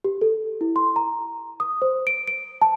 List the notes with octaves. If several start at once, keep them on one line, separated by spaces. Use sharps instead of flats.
G4
A4
E4
C6
A#5
D#6
C5
D7
D7
A5